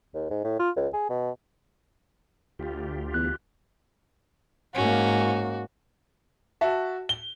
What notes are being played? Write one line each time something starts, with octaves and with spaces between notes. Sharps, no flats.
D#2
G#2
A2
F4
C#2
G#4
B2
D2 F4 G4
E2 F#6
G#2 A#3 C#4 F#4
F#4 E5 A5
G7